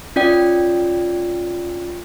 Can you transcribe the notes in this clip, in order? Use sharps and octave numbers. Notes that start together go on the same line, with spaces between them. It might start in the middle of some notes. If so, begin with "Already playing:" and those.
C#4 F4 D5 G5